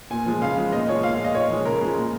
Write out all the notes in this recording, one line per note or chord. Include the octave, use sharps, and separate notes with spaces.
A#2 G#5
F3 G#3
C#3 F5
F3 G#3
A#2 D#5
F3 G#3 C#5
A#2 F5
F5
G#3
D#5
A#2 C#5
F3 G#3
C#3 A#4
F3 G#3
A#2